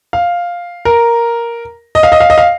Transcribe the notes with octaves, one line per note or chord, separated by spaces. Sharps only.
F5
A#4
D#5
F5
D#5
F5
D#5
F5